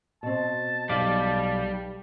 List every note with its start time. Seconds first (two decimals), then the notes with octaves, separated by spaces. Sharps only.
0.23 B2 C4 A5
0.89 B1 G3 F5 D6